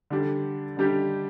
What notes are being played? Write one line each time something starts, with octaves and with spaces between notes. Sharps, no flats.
D3 G3 D4 G4
D3 G3 D4 G4